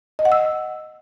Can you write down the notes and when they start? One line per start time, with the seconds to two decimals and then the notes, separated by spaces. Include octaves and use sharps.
0.19 D#5
0.25 F#5
0.32 E6